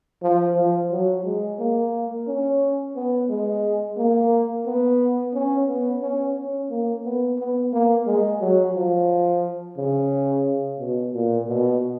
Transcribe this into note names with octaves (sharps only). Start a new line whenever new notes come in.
F3
F3
F#3
G#3
A#3
C#4
B3
G#3
A#3
B3
C#4
B3
C#4
C#4
A#3
B3
B3
A#3
G#3
F#3
F3
C#3
B2
A#2
B2